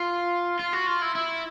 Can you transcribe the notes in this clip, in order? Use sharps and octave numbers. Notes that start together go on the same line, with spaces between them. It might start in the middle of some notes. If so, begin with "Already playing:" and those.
Already playing: F4
F4
F#4
F4
E4
E4